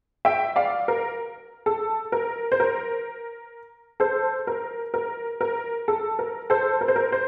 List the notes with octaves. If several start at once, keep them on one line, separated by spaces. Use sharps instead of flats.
E5 G5
D5 F5
A#4
A4
A#4
C5
A#4
A4 C5
A#4
A#4
A#4
A4
A#4
A4 C5
A#4
C5
A#4
C5